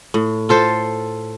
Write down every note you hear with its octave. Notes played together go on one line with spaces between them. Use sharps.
A2
F4 A4 C5